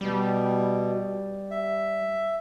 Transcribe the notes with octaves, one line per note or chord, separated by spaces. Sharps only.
B2 G3
E5